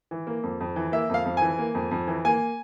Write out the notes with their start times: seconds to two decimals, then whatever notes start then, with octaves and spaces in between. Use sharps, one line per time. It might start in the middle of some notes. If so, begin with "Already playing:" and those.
0.11 E3
0.27 A#3
0.43 F2
0.60 F2
0.76 E3
0.92 A#3 E5
1.10 F2 F5
1.25 F2
1.37 E3 G#5
1.59 A#3
1.75 F2
1.91 F2
2.07 E3
2.25 A#3 G#5